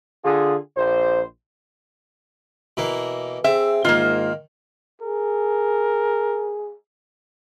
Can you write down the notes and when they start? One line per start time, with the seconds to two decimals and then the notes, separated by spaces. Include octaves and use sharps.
0.25 D3 F4 G#4
0.77 A#1 C5
2.77 B2 E3 A#3
3.44 C4 G#4 E5
3.85 G#2 D#3 A#3 F4
5.02 G#4 A#4